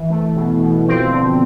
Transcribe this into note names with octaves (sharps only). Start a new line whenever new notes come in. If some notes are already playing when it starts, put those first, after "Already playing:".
Already playing: E3
A3
B2
B2
F3 C4
D3